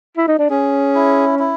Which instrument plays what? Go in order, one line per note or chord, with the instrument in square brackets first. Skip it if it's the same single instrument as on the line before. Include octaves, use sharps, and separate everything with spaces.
[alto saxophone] E4
D#4
D4
[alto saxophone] C#4 [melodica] G#4
[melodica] E4
E4